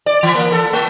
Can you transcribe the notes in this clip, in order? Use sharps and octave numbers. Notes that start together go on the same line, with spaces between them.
D5
E3
A#3
A4
A3